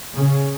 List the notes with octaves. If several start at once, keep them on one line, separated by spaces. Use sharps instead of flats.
C#3